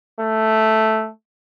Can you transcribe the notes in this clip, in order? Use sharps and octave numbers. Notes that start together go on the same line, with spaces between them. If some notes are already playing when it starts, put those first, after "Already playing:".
A3